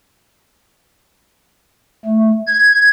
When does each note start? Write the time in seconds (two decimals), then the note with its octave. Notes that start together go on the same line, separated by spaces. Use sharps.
2.05 A3
2.46 G#6